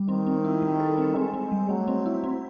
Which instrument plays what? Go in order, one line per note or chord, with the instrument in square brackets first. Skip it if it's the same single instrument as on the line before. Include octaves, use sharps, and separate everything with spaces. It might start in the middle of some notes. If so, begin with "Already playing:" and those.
Already playing: [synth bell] G3
[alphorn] D#3 [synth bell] C4
[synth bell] C4
E4
G3
A4
C4
[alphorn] G#3 [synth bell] C4
[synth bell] C4
G3
[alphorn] F#3 [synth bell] A3
[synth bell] C4
E4
C4